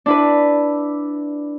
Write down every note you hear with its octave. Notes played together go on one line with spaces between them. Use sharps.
D4 E4 B4